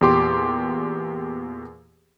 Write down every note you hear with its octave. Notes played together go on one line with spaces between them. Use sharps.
E2 A#2 G4 C6 D6